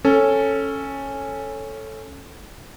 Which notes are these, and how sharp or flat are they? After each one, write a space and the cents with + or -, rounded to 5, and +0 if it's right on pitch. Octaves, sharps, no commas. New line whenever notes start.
C#4 -10 A4 +0